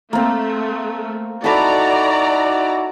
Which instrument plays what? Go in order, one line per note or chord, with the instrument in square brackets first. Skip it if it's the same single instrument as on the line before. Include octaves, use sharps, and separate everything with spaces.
[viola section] A3 [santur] A#3 C4
[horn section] D#4 E4 F#4 [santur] A4 B5 [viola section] D5 A#5